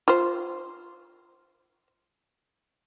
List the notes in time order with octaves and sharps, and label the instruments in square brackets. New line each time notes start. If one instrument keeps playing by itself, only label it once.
[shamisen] F4 C5